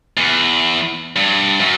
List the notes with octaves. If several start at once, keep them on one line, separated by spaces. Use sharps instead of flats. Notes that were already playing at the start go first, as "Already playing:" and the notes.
E2
G2
F#2